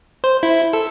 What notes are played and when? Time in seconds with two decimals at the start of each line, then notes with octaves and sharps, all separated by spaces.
0.24 C5
0.43 E4
0.73 A4